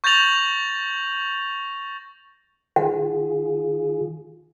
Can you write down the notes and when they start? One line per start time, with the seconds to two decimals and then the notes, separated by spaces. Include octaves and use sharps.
0.04 C#6 G6 A6 A#6 F7 F#7
2.76 D#3 F4 G#4 F#5